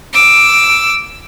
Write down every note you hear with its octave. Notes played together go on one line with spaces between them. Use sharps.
D6 E6